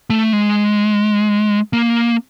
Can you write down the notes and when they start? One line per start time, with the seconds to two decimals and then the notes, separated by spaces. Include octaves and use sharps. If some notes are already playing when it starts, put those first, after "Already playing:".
0.10 A3
0.33 G#3
1.73 A#3